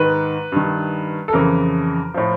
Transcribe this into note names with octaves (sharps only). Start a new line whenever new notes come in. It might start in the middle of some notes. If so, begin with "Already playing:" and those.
Already playing: G#2 D#3 B4
G2 D#3
A4
F2 C#3 E3 A#4
A2 F3